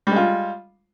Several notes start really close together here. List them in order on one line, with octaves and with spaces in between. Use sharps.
G3 G#3 F4